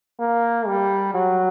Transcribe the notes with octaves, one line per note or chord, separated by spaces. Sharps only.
A#3
G3
F#3